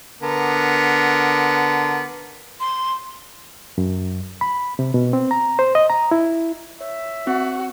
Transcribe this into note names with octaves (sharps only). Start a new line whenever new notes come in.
D3 B3 A#4
C6
F#2
B5
C3
B2
C4
A#5
C5
D#5
A#5
E4
C#5 E5
C4 F#4